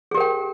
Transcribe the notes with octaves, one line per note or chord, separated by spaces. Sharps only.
G4 G#4 A#4 G5